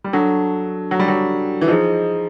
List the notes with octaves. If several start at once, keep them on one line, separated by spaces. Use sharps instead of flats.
G3
F#3 D4 F#4 A4
F#3
G3
F#3
E3
F3 D#4 G#4 C5 D#5